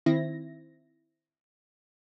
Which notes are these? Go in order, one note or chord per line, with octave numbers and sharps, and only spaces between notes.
D#3 C4 E4 A#6